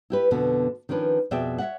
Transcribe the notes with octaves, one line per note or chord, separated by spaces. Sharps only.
E4 G4 B4
F2 B2 D3 B3
D#3 F3 C#4 D4 B4
F2 B2 G#4 D5 E5 G5
C#5 D5 E5 F#5